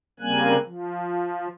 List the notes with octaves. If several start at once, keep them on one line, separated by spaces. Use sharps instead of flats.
C#3 G3 A#3 C4 G#5 F#6
F3